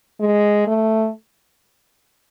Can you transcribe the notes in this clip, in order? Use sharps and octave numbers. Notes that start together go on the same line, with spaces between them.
G#3
A3